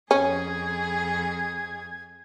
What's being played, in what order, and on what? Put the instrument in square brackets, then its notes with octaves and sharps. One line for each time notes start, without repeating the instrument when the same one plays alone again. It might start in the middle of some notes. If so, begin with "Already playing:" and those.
[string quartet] F2 G#4 [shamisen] C#4 [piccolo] G#6